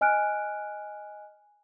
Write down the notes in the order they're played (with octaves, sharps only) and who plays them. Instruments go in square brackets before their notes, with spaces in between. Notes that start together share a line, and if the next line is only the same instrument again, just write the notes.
[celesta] D#5 G#5 F6 F#6 D7